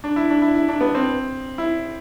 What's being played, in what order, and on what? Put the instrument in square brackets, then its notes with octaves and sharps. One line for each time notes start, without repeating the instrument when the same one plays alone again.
[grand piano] D4
E4
D4
E4
E4
D4
B3
C4
E4